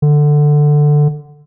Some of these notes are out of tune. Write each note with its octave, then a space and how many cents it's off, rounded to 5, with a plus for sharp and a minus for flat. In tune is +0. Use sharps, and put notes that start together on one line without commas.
D3 +10